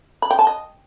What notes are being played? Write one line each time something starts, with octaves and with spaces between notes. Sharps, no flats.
B5
G5
A5
D#5